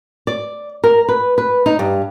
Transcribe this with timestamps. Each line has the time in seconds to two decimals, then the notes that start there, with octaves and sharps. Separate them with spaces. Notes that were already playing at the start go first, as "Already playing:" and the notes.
0.27 D5
0.84 A#4
1.09 B4
1.38 B4
1.66 D#4
1.79 G2